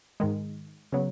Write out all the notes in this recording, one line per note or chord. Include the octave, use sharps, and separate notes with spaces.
G#2 D#3 G#3
C#3 F#3 B3